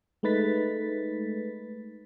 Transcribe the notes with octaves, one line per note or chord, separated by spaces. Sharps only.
G#3 A3 D#4 B4 A6 B6